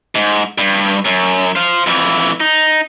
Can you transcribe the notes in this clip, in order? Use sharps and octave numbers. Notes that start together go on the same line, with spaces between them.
G#2
G2
F#2
C5 F5
F2 E3
D#4